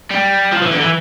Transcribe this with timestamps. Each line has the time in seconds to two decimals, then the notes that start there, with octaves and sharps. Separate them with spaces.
0.10 G3
0.52 F3
0.62 E3
0.72 D3
0.81 E3